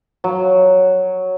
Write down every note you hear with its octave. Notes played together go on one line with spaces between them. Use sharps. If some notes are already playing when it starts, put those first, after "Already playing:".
F#3